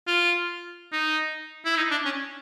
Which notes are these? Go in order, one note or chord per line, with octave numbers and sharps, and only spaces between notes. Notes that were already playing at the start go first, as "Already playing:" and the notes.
F4
D#4
E4
D#4
D4
C#4